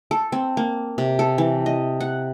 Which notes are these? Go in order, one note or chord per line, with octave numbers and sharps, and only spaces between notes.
A4
C4
A#3
C3
A4
E3
D#5
F#5